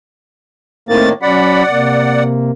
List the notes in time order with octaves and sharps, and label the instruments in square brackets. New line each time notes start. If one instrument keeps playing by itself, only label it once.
[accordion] A2 D#3 A#3 [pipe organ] A3 C4 A6
[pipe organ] F#3 C#4 B5 [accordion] D5 F#5
[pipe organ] C3 A#3